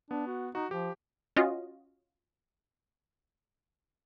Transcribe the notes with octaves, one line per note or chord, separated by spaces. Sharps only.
B3 D4
F#4
D#4 F#4
F3 G4
C#4 F4 F#4 D#5